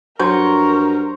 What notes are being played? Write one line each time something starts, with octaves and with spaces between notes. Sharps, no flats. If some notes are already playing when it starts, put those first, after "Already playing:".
G2 F#3 A#4 C5 C#6